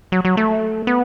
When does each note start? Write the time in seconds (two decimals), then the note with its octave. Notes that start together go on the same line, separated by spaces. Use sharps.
0.12 F#3
0.25 F#3
0.37 A3
0.87 B3